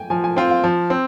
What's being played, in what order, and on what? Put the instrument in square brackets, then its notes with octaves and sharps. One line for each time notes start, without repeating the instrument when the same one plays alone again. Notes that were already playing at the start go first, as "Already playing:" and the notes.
Already playing: [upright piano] G5 G#5
[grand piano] F3 [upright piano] G#5
[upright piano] G#5
[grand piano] C4 F4 [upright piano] G5
[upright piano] F5
[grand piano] F3
C4